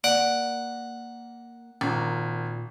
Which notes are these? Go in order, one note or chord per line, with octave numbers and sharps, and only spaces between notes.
A#3 D5 F#5
G#1 A#2 F4 A#5